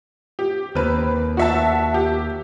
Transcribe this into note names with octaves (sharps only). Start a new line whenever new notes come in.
G4
D#2 C4 B4
F#4 E5 A5
G4